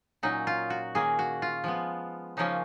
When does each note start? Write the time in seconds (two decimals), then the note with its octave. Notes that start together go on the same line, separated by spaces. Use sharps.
0.23 A#2 F#3 C#4 D#4
0.47 F4
0.70 F#4
0.95 D#3 A#3 C#4 G#4
1.19 F#4
1.42 F4
1.64 F3 G#3 B3
2.37 C#3 F3 A#3 C#4 D#4